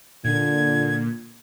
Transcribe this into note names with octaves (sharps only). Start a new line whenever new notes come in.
A#2 D3 G#6